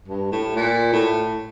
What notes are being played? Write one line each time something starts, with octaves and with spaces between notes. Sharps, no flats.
G2
A2
A#2
A2